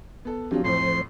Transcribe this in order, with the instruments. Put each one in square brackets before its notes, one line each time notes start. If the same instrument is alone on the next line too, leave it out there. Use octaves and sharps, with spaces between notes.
[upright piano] B3 A4
[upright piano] F3 F#3 F4 [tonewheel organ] C4 D4 G4
[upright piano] F2 A2 [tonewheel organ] F3 C5 [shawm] C6